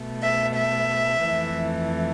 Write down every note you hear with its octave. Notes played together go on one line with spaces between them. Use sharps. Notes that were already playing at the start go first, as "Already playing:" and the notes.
Already playing: B2 A3
E5
E5
F2 E3 A3